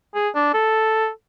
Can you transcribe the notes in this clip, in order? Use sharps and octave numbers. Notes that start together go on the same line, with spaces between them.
G#4
D4
A4